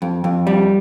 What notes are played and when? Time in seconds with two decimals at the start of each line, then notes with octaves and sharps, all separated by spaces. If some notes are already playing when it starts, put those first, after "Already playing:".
0.02 F2
0.24 F2
0.47 G3